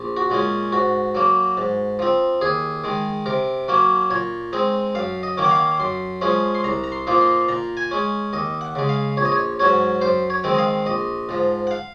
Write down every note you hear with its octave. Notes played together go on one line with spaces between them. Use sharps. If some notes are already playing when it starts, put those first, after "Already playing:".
Already playing: A#1
F#4
A#2 G#3 C#4
G#2 F#4
F#3 A#3
G#2
F3 C4
D#2 G#4
D#3 G#3
C3 A#4
F#3 A#3 C#4
A#2 C#5
G#3 C4 D#4
F#2 F5
D#5
D#3 A#3 C#4
F#5
F5
F#2 C6
F3 G#3 C#4
C6
C2 A#5
A#5
C6
A#2 F3 A#3 D#4
C6
A#2 A#5
G#5
G#3 C#4
D#2 D#5
F#5
C#3 G#3
F5
A#1 C#5
D#5
C#5
G#2 F#3 C#4 C#5
F#2 C5
C#5
D#3 G#3 C4
D#5
F5
A#1 D#5
G#2 F3
F#5
F5